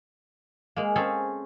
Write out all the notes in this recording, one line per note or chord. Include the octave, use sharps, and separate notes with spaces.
G#3 A#3
C4 C#4 G#4 A4